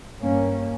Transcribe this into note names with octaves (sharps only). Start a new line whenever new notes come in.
G2 A#3 C#4